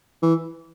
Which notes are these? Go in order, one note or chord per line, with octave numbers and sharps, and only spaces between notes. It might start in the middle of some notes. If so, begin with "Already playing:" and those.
E3